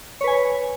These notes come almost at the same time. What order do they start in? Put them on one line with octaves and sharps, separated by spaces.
C#5 B4 G#5